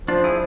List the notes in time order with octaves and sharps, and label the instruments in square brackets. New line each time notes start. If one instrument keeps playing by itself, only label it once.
[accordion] F3 [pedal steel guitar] D4 F4
[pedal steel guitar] E4 G#4